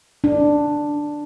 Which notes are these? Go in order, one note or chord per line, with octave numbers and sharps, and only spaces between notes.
D4